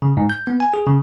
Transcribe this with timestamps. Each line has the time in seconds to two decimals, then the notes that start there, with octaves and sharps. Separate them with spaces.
0.02 C#3
0.17 G#2
0.30 G6
0.47 B3
0.60 G#5
0.74 G#4
0.87 C#3